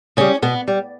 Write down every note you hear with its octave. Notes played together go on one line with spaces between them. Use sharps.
C#3 G3 C#4
B2 B3
G3